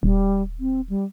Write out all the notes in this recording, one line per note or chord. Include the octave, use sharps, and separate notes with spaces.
D#1 G3
C4
G3